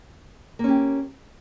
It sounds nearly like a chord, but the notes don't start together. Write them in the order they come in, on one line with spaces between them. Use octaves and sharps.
A#3 C#4 G4